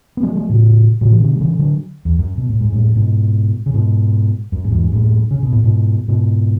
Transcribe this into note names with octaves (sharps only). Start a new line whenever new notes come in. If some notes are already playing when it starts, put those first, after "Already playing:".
B3
F#3 A3
F#3 A3
A2 C#3
A2 C#3
E3
B2 D3
F#3
C#3 E3
D3 F#3
E2
F#2
B2
A2
G#2
F#2 A2
G#2 B2
C#3
G#2 B2
F#2
A2
E2 G#2
F#2 A2
C#3
B2
A2
G#2 B2
G#2 B2